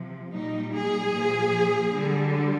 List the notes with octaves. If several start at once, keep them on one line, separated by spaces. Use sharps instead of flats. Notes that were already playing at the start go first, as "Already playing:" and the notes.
Already playing: C3 F3
A#2 G3 D#4
G#4
A#2 F3
D3 G3